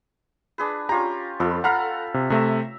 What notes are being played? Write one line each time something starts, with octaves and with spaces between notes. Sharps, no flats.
D4 G#4 B4
C#4 F4 G4 A#5
F2 F4 A4 B4
A4 F5 F#5 A#5 B5 F6
C3
C3 A3 E5 A#5 E6